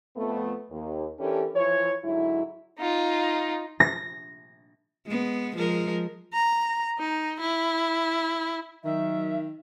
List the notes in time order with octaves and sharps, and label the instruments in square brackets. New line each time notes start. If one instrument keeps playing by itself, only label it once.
[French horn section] F2 A3 B3
D#2
E3 C#4 D4 G4 A4 A#4
E3 F3 E4 C#5
G#2 D3 F#3 E4
[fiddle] D#4 F4
[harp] A#6
[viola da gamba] G#3 B3
F3 G#3 A#4
[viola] A#5
D#4
E4
[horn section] D#3 [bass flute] F#3 [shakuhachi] E5